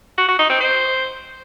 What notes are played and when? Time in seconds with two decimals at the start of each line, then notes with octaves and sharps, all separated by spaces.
0.17 F#4
0.28 F#4
0.39 D#4
0.50 C4
0.60 C5